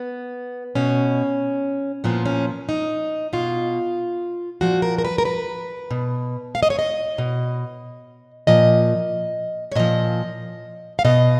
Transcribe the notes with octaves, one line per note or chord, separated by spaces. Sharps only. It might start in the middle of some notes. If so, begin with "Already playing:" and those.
Already playing: B3
B2 C#4
A#2 F3 B3
C#4
D#4
B2 F4
A#2 F3 F#4
A#4
A#4
B4
A#4
B4
B2
F5
D#5
C#5
D#5
B2
A#2 F3 D#5
C#5
A#2 F3 D#5
F5
B2 D#5